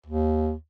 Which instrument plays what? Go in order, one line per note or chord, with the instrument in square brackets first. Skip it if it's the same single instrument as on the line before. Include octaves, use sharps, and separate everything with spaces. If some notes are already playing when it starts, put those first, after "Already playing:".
[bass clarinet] D#2